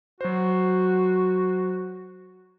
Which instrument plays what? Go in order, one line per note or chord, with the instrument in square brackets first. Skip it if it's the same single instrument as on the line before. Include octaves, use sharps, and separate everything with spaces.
[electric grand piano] F#3 C5 [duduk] F#4